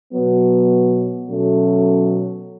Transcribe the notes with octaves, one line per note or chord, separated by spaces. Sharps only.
B2 F#3 B3
B2 F#3 A3 C#4